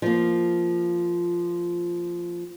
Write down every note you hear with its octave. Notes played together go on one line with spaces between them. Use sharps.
F3 A#3